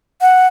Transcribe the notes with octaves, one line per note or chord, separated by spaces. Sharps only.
F#5